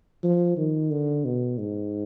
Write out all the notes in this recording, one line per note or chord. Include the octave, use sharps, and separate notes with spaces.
F3
D#3
D3
B2
G#2